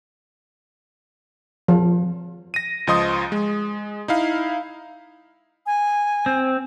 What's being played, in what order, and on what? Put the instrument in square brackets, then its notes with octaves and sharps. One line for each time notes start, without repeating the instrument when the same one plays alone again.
[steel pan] F3
[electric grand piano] A#6 D#7
C#2 F3 D#5 C6 D#6
G#3
D#4 E4 F5
[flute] G#5
[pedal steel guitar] C4